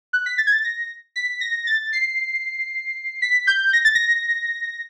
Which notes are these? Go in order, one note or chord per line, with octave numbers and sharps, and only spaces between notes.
F#6
B6
A6
G#6
A6
A#6
B6
A#6
A6
C7
B6
G6
A#6
A6
A#6